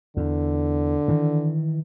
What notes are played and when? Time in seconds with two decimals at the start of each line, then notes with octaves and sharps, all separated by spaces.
0.17 E2 D3
1.08 D#3 E3